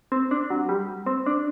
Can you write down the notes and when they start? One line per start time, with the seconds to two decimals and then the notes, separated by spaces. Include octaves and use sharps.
0.12 C4
0.31 D4
0.50 F#3
0.69 G3
1.06 C4
1.26 D4